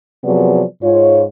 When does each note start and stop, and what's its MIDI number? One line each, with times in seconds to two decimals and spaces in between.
0.24 0.62 48
0.24 0.62 53
0.24 0.62 54
0.24 0.62 59
0.24 0.62 68
0.24 0.62 74
0.82 1.22 44
0.82 1.22 65
0.82 1.22 73